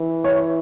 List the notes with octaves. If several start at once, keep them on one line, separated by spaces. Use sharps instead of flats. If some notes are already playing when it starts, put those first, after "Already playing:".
Already playing: E3
C#5